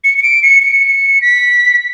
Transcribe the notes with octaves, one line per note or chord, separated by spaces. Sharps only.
C#7
C#7
D7
C#7
C#7
B6